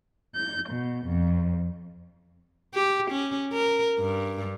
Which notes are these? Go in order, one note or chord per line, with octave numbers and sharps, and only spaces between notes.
G6
B2
F2
G4
C#4
A#4
G2